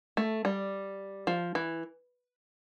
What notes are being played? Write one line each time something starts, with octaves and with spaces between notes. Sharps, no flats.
A3
G3
F3
E3